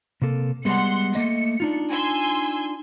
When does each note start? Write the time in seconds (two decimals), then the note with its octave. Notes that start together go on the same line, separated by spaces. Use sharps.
0.22 C3 A#3 A4
0.65 G3 G#3 B3 F#5 C6 C#7
1.15 A3 A#3 D#5 C#7
1.60 D4 D#4 F4
1.91 G#5 C6 E6